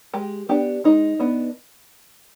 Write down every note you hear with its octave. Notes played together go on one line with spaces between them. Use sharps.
G#3 G4
B3 D4 G4
G#3 D#4
B3 D4